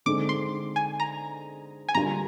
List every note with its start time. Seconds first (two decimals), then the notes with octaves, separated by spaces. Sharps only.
0.06 D3 G#3 C4 D#4 G#4 D6
0.29 C6
0.76 G#5
1.00 A#5
1.89 G#5
1.95 D3 G3 D4 F4 A#4 A#5